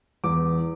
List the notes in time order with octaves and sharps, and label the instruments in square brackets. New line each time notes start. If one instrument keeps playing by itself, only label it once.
[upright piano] E2 D6